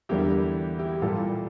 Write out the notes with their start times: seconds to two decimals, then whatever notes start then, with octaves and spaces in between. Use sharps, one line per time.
0.09 E2 D3 G3 A#3 E4 G4
0.79 E4 G4
1.02 A#2 G3 A#3 F4 A4